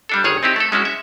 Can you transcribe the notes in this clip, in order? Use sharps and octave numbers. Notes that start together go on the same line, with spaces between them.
G3 D4 A4
G1 D#3 G#4 C#5
C4 D#4 E4 G4
A3 A4
G#3 C#4 E4 F#4
E5